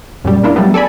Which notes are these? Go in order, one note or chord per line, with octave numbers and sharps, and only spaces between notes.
F#2 A#2 G3
A#3 D4 E4 F4 A#4
F#3 G3 A3 B3
A4 D5 G#5 B5